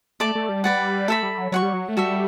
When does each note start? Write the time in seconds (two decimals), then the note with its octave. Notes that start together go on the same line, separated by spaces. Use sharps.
0.20 A3 D5 A5 D6
0.35 A3
0.49 G3
0.64 B4 D5 F#5
1.08 A3 A4 E5 B5
1.23 G3
1.38 F#3
1.52 F#3 C#5 F#5 C#6
1.62 G3
1.73 F#3
1.89 A3
1.97 G3 F#4 A4 E5